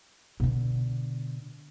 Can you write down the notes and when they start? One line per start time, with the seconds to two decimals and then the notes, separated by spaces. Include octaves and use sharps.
0.40 B2 D3